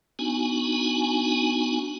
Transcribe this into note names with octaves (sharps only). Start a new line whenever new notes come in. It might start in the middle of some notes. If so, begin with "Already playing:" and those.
B3 D4 D#4 F#4 G#5